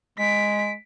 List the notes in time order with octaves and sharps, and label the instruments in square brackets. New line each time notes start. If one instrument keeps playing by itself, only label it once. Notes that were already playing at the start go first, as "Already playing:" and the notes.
[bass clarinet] G#3 [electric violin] B6 D7